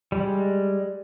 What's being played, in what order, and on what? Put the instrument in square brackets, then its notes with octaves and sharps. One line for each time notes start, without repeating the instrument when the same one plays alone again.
[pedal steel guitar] G3 G#3